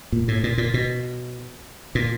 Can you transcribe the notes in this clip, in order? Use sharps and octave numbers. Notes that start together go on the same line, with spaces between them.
A#2
A2
A#2
A#2
B2
A#2